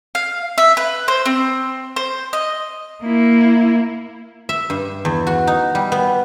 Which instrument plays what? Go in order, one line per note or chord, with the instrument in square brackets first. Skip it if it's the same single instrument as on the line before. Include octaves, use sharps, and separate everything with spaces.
[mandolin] F5
E5
B4
C5
C4
C5
D#5
[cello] A#3 E4
[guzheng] E5
G2
E2
F#4
D#4
G3
B3